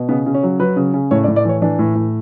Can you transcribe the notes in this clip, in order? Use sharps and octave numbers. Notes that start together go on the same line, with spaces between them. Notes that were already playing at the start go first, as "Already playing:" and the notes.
Already playing: B2
C#3 B3
C#3
C#4
F#3
F#3 B4
C#3
C#3
A2 C#5
D5
A2
D5
E3 C#5
E3 D4
A2
A2